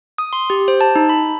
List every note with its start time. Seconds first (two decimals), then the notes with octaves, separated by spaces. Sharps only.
0.18 D#6
0.33 C6
0.50 G4
0.68 C5
0.81 A5
0.96 D#4
1.09 B5